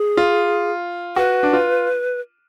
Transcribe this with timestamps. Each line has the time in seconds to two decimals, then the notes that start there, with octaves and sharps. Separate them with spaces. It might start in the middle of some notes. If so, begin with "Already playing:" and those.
Already playing: G#4
0.17 F4
1.16 F#4 B4
1.43 D4
1.53 F4